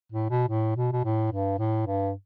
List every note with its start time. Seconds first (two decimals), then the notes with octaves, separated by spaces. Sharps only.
0.12 A2
0.30 B2
0.48 A2
0.76 B2
0.92 B2
1.04 A2
1.31 G2
1.59 A2
1.87 G2